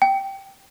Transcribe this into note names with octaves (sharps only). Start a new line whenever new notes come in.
G5